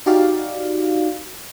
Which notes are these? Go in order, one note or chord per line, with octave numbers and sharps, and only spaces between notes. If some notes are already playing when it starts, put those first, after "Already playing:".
D#4 F#4 G4 D5 F5